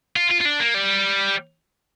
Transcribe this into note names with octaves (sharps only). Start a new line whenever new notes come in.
F4
F4
F4
D4
A#3
G3